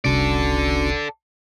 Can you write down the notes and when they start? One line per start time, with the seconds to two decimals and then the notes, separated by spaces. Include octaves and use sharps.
0.05 F1 C2 C#4 D4 F#4 A4 D5